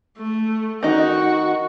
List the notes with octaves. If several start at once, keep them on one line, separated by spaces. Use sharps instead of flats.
A3
D#3 D#4 F#4